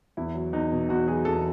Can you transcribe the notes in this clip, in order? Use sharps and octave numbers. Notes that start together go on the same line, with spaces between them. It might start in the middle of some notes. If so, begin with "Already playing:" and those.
E2 E4
F#3
E2 D#4
B2
E2 F#4
F#3 G#4
E2 A4